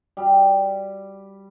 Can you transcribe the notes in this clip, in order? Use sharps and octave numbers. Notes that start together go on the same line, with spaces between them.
G3